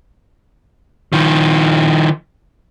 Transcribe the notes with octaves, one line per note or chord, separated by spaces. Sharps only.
D#3 F3